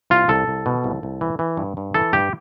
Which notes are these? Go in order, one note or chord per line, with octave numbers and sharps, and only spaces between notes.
C2 F4
C2 A4
C2
B2
C2
C2
E3
E3
G2
G2
E3 A4
G2 G4